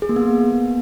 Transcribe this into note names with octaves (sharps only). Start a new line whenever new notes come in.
G#4
A#3
B3